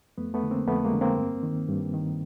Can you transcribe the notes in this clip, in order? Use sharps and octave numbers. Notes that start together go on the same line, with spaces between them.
F2 A3 B3
A3 B3
D3
A#3 C4
F2 A3 B3
G#3 A#3
D3
A#3 C4
G2
D#3
G2
D#3